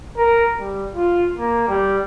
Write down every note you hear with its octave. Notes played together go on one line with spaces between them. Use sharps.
A#4
G3
F4
A#3
G3